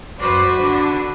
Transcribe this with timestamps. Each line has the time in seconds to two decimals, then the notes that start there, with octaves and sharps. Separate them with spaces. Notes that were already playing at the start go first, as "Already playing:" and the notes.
0.20 F#2 F#4 B4 C5 D5 D6
0.59 D3 D4